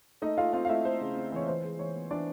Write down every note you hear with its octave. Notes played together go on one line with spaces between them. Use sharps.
A3 D#4 D#5
A3 F4 F5
C4 F4 F5
F5
A3 E4 E5
A3 C5
C#3
C4
E3 C#5
E3 C5
G#3
E3 C#5
B3
E3 D4 D5